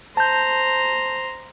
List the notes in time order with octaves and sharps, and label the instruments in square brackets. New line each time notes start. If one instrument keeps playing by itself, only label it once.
[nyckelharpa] C5 A#5 [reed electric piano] A5 G6